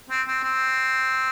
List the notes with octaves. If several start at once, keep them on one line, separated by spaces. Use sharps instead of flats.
C4
C4
C4